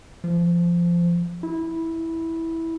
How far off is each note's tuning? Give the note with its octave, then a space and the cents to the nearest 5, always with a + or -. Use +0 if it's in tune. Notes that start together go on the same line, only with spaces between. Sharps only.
F3 -15
E4 -10